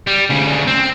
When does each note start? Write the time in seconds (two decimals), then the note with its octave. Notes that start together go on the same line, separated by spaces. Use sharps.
0.07 G3
0.30 D2 C#3
0.68 C4